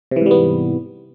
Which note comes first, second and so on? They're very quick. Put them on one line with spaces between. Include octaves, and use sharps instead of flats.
C3 E3 G#2 G3 B3